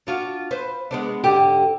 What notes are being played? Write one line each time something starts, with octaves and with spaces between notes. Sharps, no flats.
D4 F4 F#4
B4 C5
G#3 B3 D4
G#2 D3 G4